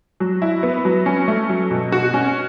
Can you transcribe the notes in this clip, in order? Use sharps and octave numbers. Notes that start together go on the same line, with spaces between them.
F#3
E4
B3
F#3
C#4
A3
F#3
B2
F#4
C#4